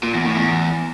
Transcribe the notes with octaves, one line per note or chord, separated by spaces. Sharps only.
A#2
E2
A2
E2